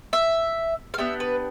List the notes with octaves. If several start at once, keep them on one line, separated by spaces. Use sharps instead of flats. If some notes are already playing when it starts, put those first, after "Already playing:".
E5
F5
B3 D4 G4 E5
B4